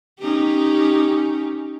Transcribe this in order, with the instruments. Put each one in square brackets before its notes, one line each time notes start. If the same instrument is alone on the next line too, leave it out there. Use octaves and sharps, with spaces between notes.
[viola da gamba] C#4 D#4 G4